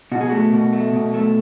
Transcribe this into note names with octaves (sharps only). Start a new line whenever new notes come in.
B2 F#4
G#4
A3 F#4
B2
A3
B2
A3